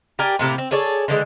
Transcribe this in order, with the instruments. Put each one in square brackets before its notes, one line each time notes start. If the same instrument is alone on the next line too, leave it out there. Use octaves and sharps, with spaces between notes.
[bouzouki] G4 A#4 D5 G#5
A2 C3 A#3 G4
C4
G#4 A4 C#5 D5
D3 E3 G#3